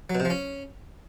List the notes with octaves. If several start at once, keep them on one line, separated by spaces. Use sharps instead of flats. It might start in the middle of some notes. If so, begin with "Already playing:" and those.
F#3
B2
C3
F3
C#4